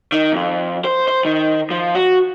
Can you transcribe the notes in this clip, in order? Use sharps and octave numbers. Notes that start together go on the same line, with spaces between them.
D#3
F2
C5
C5
D#3
F3
F#4